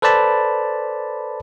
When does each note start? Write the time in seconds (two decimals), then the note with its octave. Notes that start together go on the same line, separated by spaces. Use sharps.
0.02 A4 B4 C5 D5 A5 B5